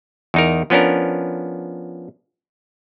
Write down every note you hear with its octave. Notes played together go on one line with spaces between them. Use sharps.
E2 D#4 A#4
F3 B3 C#4 D4 A#4